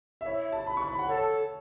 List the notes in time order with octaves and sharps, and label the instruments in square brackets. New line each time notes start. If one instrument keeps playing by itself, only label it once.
[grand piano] E5
[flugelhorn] E4 [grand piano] C#5
[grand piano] A5
B5
C#6
B5
F#5
[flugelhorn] A4 [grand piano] C#5